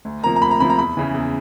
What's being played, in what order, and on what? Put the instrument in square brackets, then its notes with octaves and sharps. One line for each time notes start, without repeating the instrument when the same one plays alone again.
[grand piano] D2
C3 F3 A#3 A#5
A#5
D2 B5
A#5
C3 F3 A#3 B5
A#5
E2 B5
C#3 E3
E2